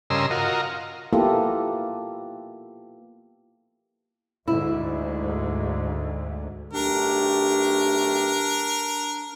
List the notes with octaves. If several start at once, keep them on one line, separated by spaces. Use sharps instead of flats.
G2 C#3 A#4 D#5 C6 E6
F4 F#4 A#4 D#5
A#3 B3 E4 F4 G4 A4
D2 G#2 E4
B1 A3 D4 G4 A#4